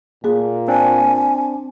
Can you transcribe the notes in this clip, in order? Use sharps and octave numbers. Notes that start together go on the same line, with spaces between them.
A#2 A#3 G#4
C4 D4 G#5